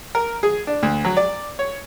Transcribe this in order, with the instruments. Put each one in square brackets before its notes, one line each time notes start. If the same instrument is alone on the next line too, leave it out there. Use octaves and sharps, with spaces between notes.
[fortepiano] A#4
G#4
D4
D2
F#3
D5
C#5